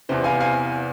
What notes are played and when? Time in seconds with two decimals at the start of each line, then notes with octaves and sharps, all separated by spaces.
0.09 E2 C3 E3 C5
0.24 F5 G#5
0.40 F5 G#5